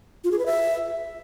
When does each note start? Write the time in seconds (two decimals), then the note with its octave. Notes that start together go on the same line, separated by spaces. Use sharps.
0.24 F4
0.32 G#4
0.39 B4
0.46 E5